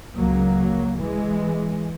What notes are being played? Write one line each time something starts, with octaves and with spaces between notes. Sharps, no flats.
C#2 C#3 F#3 A#3
E3 G#3